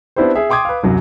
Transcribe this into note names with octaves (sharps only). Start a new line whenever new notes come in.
B3 C4 D4 E4 G4 C5
G#4 E5
G5 C6 D6 D#6 G#6
B4 F5
C2 F#2 F#3